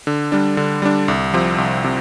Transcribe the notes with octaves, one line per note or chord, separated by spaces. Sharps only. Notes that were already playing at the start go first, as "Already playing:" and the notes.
D3
G3 D4
D3
G3 D4
C2
C3 F3 C4
C2
C3